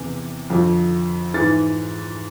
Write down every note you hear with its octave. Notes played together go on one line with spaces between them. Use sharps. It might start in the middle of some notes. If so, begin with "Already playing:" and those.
Already playing: E2 C3 E3
F2 D3 F3
G#2 E3 A6